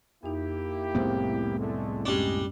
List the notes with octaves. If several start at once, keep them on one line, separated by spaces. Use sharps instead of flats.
F2 A#3 D#4 E4 G4
C2 A2 B3 C4 G#4 C5
D3 G#3 A3
F#2 G3 G#3 C#4 D4